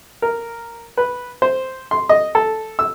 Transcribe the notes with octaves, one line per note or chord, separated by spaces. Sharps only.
A#4
B4
C5
C6
D#5
A4
E6